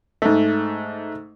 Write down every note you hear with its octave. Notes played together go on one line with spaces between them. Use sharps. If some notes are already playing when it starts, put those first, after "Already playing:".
G#2 A3